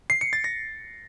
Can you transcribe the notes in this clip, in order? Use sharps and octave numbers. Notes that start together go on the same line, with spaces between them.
C7
C#7
A6
A#6